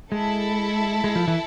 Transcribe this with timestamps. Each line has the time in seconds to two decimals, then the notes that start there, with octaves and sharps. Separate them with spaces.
0.12 G#3 E4 A4 E5 A5
1.04 G#3
1.15 F3
1.28 E3